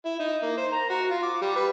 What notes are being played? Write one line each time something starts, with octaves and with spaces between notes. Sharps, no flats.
E4
D#4
A#3
C5
A#5
F#4
F4
D6
G3
B4